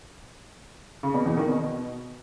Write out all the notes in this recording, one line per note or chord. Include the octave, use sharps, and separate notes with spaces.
C#3
B2
E2
D#3
B2